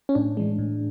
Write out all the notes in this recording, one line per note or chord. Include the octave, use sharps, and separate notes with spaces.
C#4
A2 D4
E3 G#3
A2